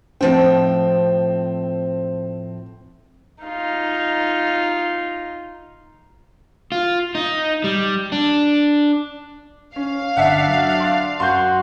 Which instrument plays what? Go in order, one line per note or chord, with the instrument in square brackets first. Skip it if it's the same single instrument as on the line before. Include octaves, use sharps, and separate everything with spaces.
[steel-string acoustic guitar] A2 F3 G5 [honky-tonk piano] C4
[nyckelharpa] D#4 F4
[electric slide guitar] F4
D#4
G3
D4
[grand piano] C#4 [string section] F5
[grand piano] G1 [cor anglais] D4 [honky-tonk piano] E5 F#5
[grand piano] F#3
C6 F#6 A6
[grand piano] F#2 G6 [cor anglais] F#4 [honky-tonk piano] C6